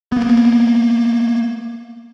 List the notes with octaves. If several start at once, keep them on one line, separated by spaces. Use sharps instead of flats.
A#3 B3